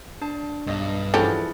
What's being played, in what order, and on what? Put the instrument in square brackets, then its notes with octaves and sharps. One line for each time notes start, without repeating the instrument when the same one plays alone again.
[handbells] D4 [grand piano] A5
[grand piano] B1 D#5 [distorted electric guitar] G2
[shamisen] D3 C#4 G4 [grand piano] E3 F3 [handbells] E4 G#4